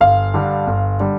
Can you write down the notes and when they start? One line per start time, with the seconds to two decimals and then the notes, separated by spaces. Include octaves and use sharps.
0.01 G1 F5
0.34 G2 D3 G3
0.67 G1
1.00 D3 G3